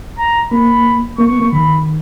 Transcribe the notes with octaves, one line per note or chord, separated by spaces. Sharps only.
A#5
A#3 B5
A#3 C#6
B3
A#3
D#3 B5